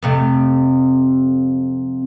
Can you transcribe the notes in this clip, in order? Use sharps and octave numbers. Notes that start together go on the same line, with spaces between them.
F2 C3 A3